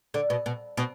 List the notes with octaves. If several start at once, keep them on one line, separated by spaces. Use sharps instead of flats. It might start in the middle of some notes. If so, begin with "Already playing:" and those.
D3
B2
B2
B2